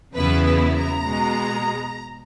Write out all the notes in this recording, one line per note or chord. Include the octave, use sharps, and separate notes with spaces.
E2 C#3 F#3 B3 E4 B4
B4
A#5
B2 G#3 B3